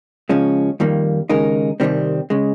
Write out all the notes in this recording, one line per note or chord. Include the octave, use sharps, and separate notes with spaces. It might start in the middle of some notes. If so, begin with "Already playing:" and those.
C#3 F3 G#3 C#4
F2 D#3 G3 A#3
D#2 C#3 G#3 D#4 A#4
C2 C3 D#3 G3 C4
C#3 G#3